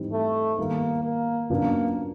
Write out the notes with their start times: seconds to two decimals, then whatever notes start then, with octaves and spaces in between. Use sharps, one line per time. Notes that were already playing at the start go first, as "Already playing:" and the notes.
Already playing: G#2 E3 G3 C4
0.12 A3
0.58 D#3 G3 A#3 B3
1.04 A#3
1.50 C#3 F#3 A#3 B3 D4 F4